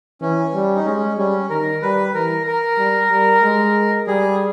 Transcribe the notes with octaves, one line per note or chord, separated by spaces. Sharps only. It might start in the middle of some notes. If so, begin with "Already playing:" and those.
E3 C#4
G3
D#4
G#3 C#4
G3 C#4
D#3 A#4
G3 B4
E3 A#4
A#4
G3
G3
G#3
G3 G#4